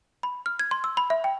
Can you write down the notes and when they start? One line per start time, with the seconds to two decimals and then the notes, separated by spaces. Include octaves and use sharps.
0.23 B5
0.46 F6
0.60 G#6
0.71 C6
0.84 E6
0.97 B5
1.10 E5
1.24 G5